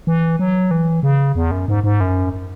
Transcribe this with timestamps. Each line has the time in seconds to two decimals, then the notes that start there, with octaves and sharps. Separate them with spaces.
0.07 E3
0.39 F#3
0.71 E3
1.03 C#3
1.35 E2
1.51 F#2
1.68 G#2
1.84 G#2
2.00 F#2